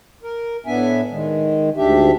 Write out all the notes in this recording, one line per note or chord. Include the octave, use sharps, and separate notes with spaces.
A#4
A2 B3 D4 E5 G#5
D#3 G#3
D2 G#2 D4 G4 E5